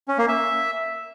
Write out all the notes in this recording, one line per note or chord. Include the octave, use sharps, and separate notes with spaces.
C#4
A#3
E5